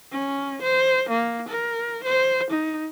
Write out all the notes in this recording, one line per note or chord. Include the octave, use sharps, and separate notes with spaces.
C#4
C5
A#3
A#4
C5
D#4